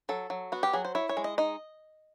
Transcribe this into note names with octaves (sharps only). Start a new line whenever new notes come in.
F#3 A4
F#3
B3 F#4
G4
F#3 G#4
C5
E4 C#5
C#5
G#3
D#5
D#4 D#5